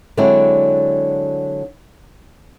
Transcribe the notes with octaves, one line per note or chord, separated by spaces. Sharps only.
D3 F#3 G#3 C4 D4 E4